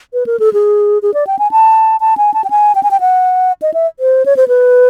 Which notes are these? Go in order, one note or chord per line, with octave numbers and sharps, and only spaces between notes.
B4
A#4
A4
G#4
G#4
D5
G5
G#5
A5
A5
G#5
A5
G5
G#5
G5
G#5
G5
F#5
D#5
E5
C5
C#5
C5
B4